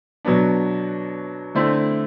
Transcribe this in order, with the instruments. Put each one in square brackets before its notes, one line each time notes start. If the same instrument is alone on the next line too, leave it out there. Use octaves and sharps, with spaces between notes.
[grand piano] B2 F#3 B3 D4
D3 A3 C4 E4